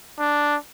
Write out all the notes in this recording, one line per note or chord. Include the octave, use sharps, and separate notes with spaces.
D4